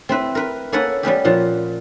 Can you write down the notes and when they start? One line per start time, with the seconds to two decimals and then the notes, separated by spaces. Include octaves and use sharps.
0.09 C4 E4 B4
0.35 A#4 B4
0.72 A#3 C#4 A4 B4 C#5 F#5
1.03 G3 B3 C#4 G4
1.25 A#2 F3 F#4